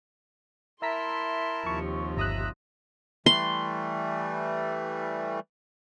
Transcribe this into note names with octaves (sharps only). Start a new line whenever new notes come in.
E4 A#4 E5 A5 A#5 C6 B6
D#2 C3 F3 C#6
G1 E5 A#5 D#6 F#6
E3 G3 A3 C6